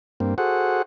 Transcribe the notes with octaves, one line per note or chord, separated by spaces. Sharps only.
G2 A#3 C4
F#4 G#4 A4 C5 F#5